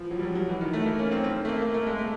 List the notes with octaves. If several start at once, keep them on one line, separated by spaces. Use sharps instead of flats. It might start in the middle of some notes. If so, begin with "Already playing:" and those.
Already playing: E3 F3
F#3
G3
F#3
F#3
E3
D#3
A3
A#3
C#4
C4
C4
A3
A#3
A#3
A3
G#3
A3